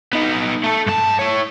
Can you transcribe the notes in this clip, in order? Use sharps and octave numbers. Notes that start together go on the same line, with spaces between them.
B3 D#4
A3 A4
G2 A5
E4 C#5